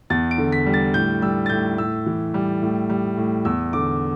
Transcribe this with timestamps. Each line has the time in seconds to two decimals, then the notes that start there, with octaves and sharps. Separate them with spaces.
0.10 E2 A6
0.31 D7
0.38 D3
0.52 B6
0.66 G3
0.74 A6
0.94 A2 G6
1.22 G3 E6
1.46 A6
1.49 A2 G6
1.78 A2 E6
2.06 E3
2.34 G3
2.62 A2
2.90 G3
3.17 A2
3.45 E2 E6
3.73 D3 D6